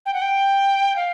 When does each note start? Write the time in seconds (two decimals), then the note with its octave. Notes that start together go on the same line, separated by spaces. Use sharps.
0.06 G5
0.14 F#5
0.22 G5
0.96 F5